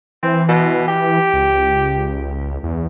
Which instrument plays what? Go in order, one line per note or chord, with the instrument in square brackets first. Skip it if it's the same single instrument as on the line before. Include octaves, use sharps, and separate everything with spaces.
[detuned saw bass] E3 [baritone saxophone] C4
[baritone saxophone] B2
G4
[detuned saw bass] C#2
E2